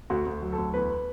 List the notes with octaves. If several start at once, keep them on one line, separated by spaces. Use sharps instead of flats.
D2 F#4
D2
F#3
A4
D2
E2 B4